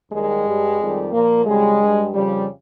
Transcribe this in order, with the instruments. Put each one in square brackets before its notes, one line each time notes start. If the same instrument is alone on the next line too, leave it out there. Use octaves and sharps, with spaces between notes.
[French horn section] D#2 D#3 G3 G#3
G2 G3
F2 D#3 G3
A#2 F3 A#3
F2 C#3 G3 G#3
G2 G3
F2 C#3 F3 G3